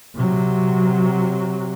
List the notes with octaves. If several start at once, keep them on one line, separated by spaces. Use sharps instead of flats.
C3 F#3